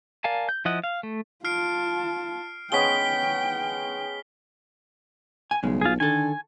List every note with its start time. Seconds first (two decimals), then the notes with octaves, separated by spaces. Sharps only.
0.24 A#4 D5 F5 G#5 A5
0.49 G6
0.65 F3 E4 D#5 F#5
0.84 F5
1.03 A3
1.45 F4 A5 F6 C7 D7
2.72 G#3 B3 C#4 G5 B6 G7
5.51 G#5
5.63 B1 G2 C#3 G#3
5.81 F4 G#4
6.00 D3 D#3 A4 G#5